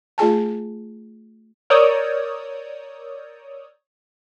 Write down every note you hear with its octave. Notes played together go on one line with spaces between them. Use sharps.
A3 F4 G#4 G#5 A5
A#4 C#5 D5 D#6 E6 G6